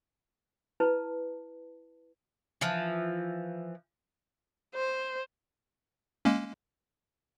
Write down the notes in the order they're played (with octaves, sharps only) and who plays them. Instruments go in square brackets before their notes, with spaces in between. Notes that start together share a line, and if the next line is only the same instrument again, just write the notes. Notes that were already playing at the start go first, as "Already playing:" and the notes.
[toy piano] E4 B4 A5
[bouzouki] E3 F3
[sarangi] C5
[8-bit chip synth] G#3 A#3 C#4